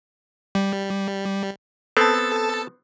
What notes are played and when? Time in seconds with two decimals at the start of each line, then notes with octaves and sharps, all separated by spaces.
0.55 G3
1.97 B3 C4 A4 A5